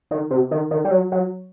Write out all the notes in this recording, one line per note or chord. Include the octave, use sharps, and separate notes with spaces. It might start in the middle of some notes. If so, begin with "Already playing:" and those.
D#3
C3
D#3
D#3
G3
F#3
F#3